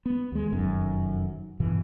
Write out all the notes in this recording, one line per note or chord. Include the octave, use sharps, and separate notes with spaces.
B3
D#2 G#3
F1 F#2 D#3 C#4
G2 B2 E3